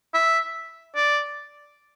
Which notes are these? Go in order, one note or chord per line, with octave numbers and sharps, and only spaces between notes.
E5
D5